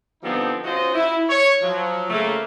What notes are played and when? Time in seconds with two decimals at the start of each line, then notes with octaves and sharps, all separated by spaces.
0.23 D3 F3 G3 B3 C4 D#4
0.65 C#4 F4 F#4 C5 D#5
0.95 E4
1.28 C#5
1.62 F3 F#3
2.10 C#3 A3 A#3